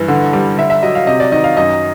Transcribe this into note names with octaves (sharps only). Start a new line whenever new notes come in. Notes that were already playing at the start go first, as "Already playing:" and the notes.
Already playing: G2 E3
D3
G3
D3 E5
E5
F#3 D#5
F5
C3 D#5
D5
D#3 D#5
F5
F#2 D#5